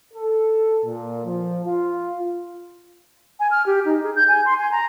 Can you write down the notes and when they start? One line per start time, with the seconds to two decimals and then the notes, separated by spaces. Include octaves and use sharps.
0.14 A4
0.84 A#2
1.25 F3
1.65 F4
3.40 G#5
3.51 F6
3.66 G4
3.86 D#4
4.03 G#4
4.16 G6
4.28 G#5
4.46 C6
4.59 G#5
4.71 A#5